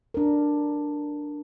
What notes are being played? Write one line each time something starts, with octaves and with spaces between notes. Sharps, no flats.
D4 A#4